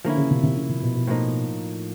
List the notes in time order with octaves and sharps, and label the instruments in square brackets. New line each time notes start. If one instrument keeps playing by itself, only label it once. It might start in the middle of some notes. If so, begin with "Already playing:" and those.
[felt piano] D3 [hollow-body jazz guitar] F3 A#3 C#4 E4
[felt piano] C#3
C3
C3
C#3
C3
B2
B2
[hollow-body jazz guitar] A2 F3 A#3 D#4